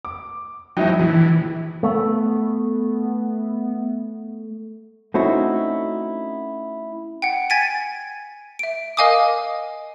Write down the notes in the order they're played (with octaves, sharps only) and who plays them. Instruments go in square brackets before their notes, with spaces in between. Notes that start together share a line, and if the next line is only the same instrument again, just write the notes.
[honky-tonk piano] D6
[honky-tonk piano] F3 E4 G5 [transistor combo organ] F#3 D#4
[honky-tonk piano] A#1 [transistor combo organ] E3
[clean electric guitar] A3 [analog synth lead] B3
[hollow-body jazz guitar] A3 C4 C#4 D#4 E4 F#4
[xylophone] F#5 G5
G#5 G#6 A6 B6 D7 D#7
E5 D7
A#4 D#5 F5 G#5 D6 D#6